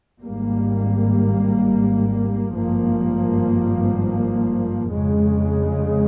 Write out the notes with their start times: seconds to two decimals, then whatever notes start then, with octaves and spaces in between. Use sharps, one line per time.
0.22 G#1 G#2 G3 A#3
2.55 G#1 G2 F3 A#3
4.87 F2 C#3 G#3